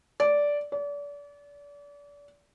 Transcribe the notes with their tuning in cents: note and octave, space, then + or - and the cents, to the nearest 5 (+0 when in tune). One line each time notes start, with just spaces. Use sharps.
D5 -10
D5 -35